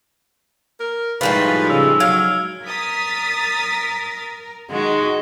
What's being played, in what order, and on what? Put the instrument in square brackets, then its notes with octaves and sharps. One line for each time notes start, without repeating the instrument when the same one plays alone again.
[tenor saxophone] A#4
[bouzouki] A2 G3 F4 [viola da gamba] F3 G#3 D#4 [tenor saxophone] B4
[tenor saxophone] C#3 [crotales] E6 F7
[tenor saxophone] F#3 [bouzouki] F5 [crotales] F6 G#6 D7
[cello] A#4 [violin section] D#6 A6 B6
[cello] D#3 F#4 [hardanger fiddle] G#3